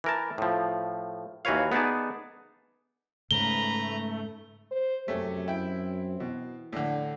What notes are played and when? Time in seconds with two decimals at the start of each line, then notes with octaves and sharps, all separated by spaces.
0.04 E3 A#4 A5
0.38 A2 F3
1.45 D#2 E3 F#4 B4 C#5 F5
1.72 B3 D#4 G#4 D5 A5
3.31 G#2 C#3 A3 B4 A#5 G7
4.71 C5
5.08 F#2 C3 A3 C#4
5.48 C4 E4 G5
6.20 B2 E3
6.73 A2 D3 D4